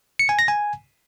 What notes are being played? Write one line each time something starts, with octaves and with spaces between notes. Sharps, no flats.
C#7
G#5
A#6
G#5